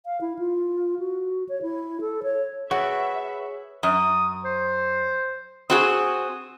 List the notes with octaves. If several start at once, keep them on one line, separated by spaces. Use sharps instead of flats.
F5
E4
F4
F#4
C#5
E4
A4
C#5
F#4 G#4 B4 C#5 E5 F#5 C#6
F#2 D#6
C5
C4 F#4 G#4 D#6